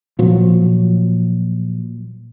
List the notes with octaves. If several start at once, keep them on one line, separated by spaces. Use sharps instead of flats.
A#2 F3 F#3